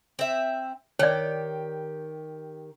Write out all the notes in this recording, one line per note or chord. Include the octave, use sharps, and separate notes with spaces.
C4 E5
D#3 G4 C#5 D5